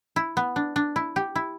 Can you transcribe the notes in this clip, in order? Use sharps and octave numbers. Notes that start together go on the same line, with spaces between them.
E4
B3
D4
D4
E4
G4
E4